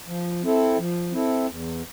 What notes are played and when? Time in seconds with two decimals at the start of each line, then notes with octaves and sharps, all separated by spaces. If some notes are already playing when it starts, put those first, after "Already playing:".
0.07 F3
0.42 C4 E4 A4
0.77 F3
1.12 C4 E4 A4
1.47 E2